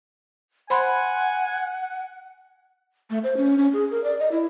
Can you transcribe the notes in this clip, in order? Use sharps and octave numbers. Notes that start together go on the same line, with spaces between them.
C5 F#5 G#5 B5 C6
A3
C5
C#4
C#4
G#4
A#4
D5
D#5
E4